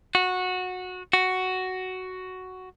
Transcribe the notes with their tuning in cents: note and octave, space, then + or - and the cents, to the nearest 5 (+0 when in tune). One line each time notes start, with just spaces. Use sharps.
F#4 -15
F#4 +5